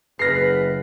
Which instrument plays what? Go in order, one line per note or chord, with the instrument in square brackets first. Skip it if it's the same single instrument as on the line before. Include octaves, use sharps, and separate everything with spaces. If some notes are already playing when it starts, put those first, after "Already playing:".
[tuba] F#1 [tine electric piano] G#4 F6 [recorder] B4 [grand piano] A#6 C7